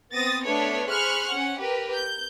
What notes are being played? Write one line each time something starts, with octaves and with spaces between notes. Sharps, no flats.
B3 C4 D#6 A6 A#6
A3 B3 D4 A4 B4 C#5
G#4 C5 B5 C#6 F6 F#6
C#4 F#5
G4 A#4 B4
G6